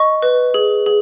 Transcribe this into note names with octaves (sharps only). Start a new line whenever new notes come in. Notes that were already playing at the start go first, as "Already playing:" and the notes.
Already playing: D#5 C#6
B4
G#4
G#4